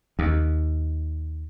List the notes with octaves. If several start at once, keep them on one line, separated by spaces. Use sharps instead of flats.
D#2